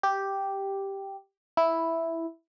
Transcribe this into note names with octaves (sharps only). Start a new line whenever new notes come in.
G4
E4